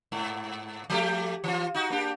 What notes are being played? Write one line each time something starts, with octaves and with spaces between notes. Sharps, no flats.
G#2
F3 A3 G4
E3 F4
D#4 F#4
A#3 D4 G4